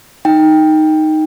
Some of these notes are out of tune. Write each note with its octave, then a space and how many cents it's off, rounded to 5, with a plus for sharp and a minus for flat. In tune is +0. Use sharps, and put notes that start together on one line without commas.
D#4 +0 G5 +10